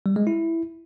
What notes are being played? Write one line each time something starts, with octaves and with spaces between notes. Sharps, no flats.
G3
G#3
E4